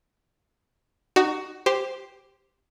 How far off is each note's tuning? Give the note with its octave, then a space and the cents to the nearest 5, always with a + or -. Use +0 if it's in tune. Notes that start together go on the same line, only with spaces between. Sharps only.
D#4 -25 F#4 +15
G4 +0 C5 -5